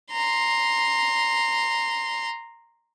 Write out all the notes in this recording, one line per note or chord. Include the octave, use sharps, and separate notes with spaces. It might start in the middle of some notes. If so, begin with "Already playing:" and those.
A#5 C6